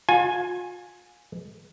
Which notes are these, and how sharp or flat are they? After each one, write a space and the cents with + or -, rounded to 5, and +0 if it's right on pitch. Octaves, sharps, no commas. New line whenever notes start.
F4 +35 G#5 +0